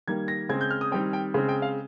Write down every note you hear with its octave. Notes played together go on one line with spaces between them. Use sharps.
D#3 G3 A#3 G#6
A#6
C#3 G#3 C4 G#6
G6
F6
D#6
D#3 G3 C4 G5
G5
C#3 G#3 C4
G5
F5